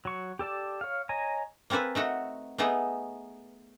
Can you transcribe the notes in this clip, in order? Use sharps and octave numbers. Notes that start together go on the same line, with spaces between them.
F#3 C#6
G4 A4 D5 A5
C#5 F5
C#5 D#5 G#5 A#5
A#3 C4 A4 B4 G#5
A3 D#4 F#4
A3 B3 D#4 G#4